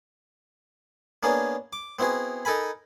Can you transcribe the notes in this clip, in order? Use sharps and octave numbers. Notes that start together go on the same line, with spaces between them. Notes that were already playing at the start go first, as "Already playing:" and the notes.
A#3 B3 C#4 D4 G#4
D6
B3 C4 E4 F#4 G#4
D#4 A4 A#4 G#5 B5